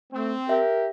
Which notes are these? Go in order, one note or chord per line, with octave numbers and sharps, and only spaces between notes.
A3 C4
G4 A#4 E5